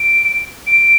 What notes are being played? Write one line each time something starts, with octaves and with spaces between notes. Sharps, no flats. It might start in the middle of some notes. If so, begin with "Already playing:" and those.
Already playing: D7
D7